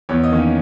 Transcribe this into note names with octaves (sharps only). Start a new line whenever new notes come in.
E2 C#5
D#5
D#3 A#3 C#4
D#5